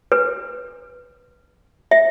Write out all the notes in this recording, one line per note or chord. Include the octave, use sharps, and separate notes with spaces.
B4
E5